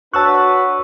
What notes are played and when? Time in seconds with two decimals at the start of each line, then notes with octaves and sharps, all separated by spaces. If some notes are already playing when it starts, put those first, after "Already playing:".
0.14 D4 F#4 B4 C#5 A5 C#6 E6 F#6